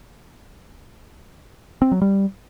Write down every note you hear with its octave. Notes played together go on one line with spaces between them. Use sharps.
C4
F#3
G3